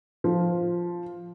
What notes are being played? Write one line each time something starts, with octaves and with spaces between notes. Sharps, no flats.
F3